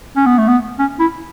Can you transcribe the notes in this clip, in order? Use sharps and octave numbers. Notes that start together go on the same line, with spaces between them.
C#4
B3
A3
B3
C#4
E4